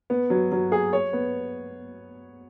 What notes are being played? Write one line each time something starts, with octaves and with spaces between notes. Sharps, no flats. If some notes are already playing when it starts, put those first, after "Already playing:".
B3
F#3
F#3
G#4
C#5
B3